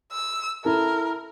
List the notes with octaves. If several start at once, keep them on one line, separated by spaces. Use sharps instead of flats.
E6
E4 A4 A#4